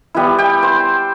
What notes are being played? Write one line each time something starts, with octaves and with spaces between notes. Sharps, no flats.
G3 B3 E4
G5
C5